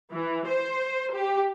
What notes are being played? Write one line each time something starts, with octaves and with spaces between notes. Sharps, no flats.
E3
C5
G4